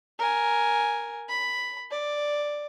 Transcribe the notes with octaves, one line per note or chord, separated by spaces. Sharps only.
A#4 G#5
B5
D5